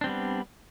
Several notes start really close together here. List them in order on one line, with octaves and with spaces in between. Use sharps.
D4 C4 G3 B3